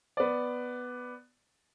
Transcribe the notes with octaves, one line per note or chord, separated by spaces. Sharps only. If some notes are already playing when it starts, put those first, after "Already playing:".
B3 D5